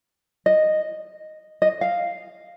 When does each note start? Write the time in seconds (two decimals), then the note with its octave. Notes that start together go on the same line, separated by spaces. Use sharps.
0.46 D#5
1.62 D#5
1.81 F5